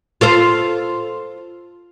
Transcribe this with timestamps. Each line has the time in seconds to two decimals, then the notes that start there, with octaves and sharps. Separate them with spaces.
0.21 F4 A4 C5